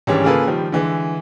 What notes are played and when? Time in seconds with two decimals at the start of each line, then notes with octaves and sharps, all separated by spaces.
0.07 G#2 D#3 E3 G3 C#4 D4
0.24 C#3 A#3 F4 G#4 A4 B4
0.47 D#3 F3 G3
0.72 D3 E3 G#3